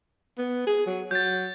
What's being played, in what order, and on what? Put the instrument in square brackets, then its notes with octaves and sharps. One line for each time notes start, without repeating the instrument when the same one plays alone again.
[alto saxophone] B3
G#4
F#3
[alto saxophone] F#3 [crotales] G6 A6